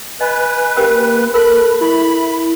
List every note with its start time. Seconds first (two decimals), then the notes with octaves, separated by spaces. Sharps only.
0.20 B4 D#5 G#5
0.76 A#3 C#4 G4 A#4
1.34 A4 A#4 B5 F#6
1.81 E4 B5